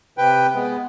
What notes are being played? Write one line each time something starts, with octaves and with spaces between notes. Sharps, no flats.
C3 B4 G5
G#3 B3